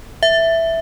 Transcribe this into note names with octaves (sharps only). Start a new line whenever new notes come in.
E5